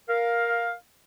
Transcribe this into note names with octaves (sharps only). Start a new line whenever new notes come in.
A#4 F5